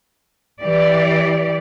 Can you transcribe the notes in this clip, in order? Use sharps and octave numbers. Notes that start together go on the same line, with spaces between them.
E3 G4 D5